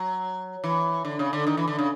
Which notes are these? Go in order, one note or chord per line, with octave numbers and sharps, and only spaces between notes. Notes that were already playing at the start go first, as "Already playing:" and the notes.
Already playing: F#3
E3
D3
C#3
D3
D#3
E3
D3
C#3